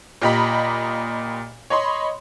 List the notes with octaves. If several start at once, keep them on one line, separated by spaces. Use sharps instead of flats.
A#2 G4 D#5 A#5 B5 B6
C#5 D#5 B5 C6